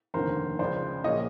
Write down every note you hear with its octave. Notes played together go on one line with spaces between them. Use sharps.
F1 D#2 D3 A#4 C5
C#2 C#3 F3 C5 D5
A#1 A#2 F3 C#5 D#5